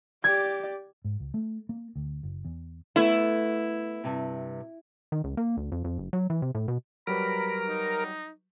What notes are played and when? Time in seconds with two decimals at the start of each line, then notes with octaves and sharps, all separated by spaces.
0.24 G4 D5 G#6
1.05 G#2
1.20 C#2
1.34 A3
1.69 A#3
1.96 D2
2.23 F#1
2.45 E2
2.96 A3 B3 E4
4.04 G2 C3
5.12 D#3
5.24 C#2
5.37 A#3
5.57 D2
5.72 F2
5.84 F2
5.98 F#1
6.13 F#3
6.30 E3
6.42 C3
6.55 A2
6.68 B2
7.07 F#3 G3 A#4 B4 B5
7.68 D#4